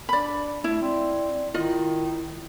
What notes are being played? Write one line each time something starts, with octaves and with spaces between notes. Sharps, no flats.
D4 D5 B5
A3 E4
C4 D5
D#3 E4 F4 D#5